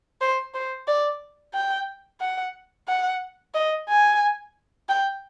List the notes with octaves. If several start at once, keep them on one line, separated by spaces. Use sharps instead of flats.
C5
C5
D5
G5
F#5
F#5
D#5
G#5
G5